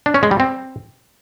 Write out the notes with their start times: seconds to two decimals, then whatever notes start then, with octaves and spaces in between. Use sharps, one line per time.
0.06 D4
0.14 C#4
0.23 G#3
0.31 G3
0.40 C4